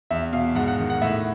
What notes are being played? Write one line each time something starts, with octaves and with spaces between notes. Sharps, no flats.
E2 E5
B2 F5
G#2 F#5
F#5
D#3
F#5
A2 E5